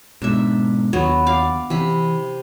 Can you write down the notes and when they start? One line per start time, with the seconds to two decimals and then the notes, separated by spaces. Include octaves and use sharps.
0.22 G#2 B2 D4 E5
0.93 D#2 F#3 B3 F#4
1.26 D5 F5
1.70 C3 E3 B5